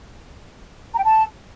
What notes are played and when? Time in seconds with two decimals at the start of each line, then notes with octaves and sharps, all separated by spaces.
0.93 A#5
0.99 G5
1.04 A5